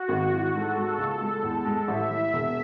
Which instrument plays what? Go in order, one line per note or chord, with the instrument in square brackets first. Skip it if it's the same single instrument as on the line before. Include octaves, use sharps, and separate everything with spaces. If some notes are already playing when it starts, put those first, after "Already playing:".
Already playing: [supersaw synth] F#4
[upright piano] G#1
E3
[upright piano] G#2 [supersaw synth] A4
[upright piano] G#3
C#2
G#3
E2
G#3
[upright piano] A1 [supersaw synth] E5
[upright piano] E3
[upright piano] E1 [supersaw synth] E5